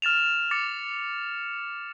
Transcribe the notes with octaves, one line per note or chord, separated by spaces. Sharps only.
F6 A6 E7 F7
D6 A6 C#7